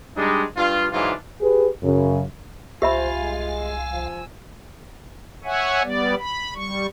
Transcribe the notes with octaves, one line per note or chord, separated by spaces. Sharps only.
G3 G#3 D4 D#4
G2 F4
G#2 E3 F#3 D4 F4
G4 G#4 B4
F#2 C#3
C2 F4 G4 C5 E5 F5 G#5 B5
G#3
G#5 E6
F3
C#5 E5 F#5 G#5
G3 B3 D5
B5
G3 C#6